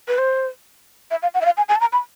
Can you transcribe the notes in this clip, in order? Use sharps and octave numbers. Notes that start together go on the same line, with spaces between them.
B4
C5
E5
F5
F#5
E5
F5
G#5
G#5
A5
A#5
B5